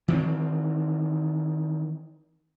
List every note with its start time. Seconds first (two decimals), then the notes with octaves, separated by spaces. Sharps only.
0.08 D#3 E3 G#3 C4